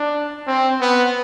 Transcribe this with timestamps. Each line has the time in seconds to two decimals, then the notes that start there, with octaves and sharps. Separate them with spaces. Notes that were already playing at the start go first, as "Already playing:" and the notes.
Already playing: D4
0.47 C4
0.81 B3